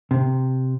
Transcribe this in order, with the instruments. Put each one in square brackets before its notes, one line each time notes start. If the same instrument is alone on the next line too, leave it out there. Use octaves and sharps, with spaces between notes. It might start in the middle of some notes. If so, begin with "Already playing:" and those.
[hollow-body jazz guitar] C3